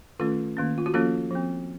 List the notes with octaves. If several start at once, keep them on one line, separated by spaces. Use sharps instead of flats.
D#3 A3 C#4 F4 A4
D#3 A#3 C#4
F4
F#4
F3 A#3 C#4 F4 A4
F3 C4